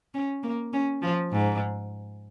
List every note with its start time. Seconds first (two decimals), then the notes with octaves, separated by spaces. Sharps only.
0.14 C#4
0.43 A#3
0.73 C#4
1.02 F3
1.32 G#2